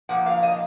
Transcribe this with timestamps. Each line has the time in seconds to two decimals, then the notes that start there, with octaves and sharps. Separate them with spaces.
0.09 A#2 F3 A#3 F#5
0.26 F5
0.43 D#5